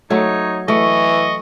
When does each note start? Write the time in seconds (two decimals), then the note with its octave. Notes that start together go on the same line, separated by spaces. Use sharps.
0.10 F#3 A3 D#4 C#5
0.68 E3 A3 D#5 C#6